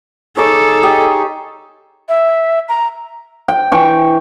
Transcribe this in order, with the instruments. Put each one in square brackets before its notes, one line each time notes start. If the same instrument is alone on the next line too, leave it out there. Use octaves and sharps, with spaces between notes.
[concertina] D#4 G#4 [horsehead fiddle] A4 [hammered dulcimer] C#5 D6
[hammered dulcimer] G4 D#5
[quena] E5
A#5
[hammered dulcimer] G5
E3 G5 C#6